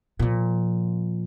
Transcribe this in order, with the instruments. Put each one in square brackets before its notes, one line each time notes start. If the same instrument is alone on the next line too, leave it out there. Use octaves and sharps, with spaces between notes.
[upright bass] A#2 F3